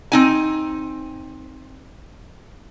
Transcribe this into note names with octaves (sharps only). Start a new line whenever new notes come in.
C4 D#4 G#5